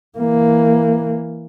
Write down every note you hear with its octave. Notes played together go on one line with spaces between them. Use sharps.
E3 A#3